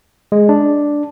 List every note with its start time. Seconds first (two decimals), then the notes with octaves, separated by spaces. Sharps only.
0.32 G#3
0.49 D4